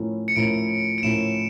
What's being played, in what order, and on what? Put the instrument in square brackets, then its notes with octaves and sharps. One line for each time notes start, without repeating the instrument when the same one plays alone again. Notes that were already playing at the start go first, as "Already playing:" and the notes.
Already playing: [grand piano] A2 F3 C#4 E4 A#4
[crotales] C#7
[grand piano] A2 F3 C#4 E4 A#4 [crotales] D7
[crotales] D7
[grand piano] A2 F3 C#4 E4 A#4 [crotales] E7